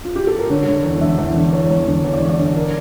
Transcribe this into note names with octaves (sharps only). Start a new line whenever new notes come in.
F4
G4
A4
A#4
D3 C#5
D3
E2
D3 E5
E2
D3
E2 C#5
E2
D3
E2 C#5
D5
D3 C#5
D5
D3 C#5
A#4